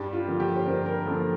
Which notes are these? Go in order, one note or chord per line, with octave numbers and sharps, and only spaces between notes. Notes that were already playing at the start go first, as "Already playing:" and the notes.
Already playing: G2 G4
F4
D3 F3 A#3
G4
C5
G2 A#4
A#4
D3 F3 A#3 A4